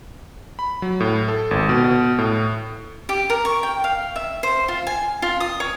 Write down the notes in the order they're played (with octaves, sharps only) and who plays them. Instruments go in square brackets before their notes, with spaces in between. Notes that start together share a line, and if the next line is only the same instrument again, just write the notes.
[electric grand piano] B5
F#3
A2
A4
G#1
B2
B2
A2
[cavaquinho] G4
A#4
C#6
G5
F5
E5
C5
F4
G#5
F4
D#6
C#5